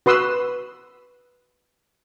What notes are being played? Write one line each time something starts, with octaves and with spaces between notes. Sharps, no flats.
F#4 B4 C6 D#6 E6